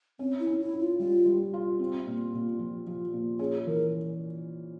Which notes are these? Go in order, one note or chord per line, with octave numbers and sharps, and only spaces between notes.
C4 C#4
E4
C#4
E4
C#4
F4
G3 F4
G3
F4
C4
A#2
A#2
F3
F3
A#2
C#4 G#4
E3 A#4